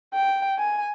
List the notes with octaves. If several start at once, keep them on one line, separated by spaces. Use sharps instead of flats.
G5
G#5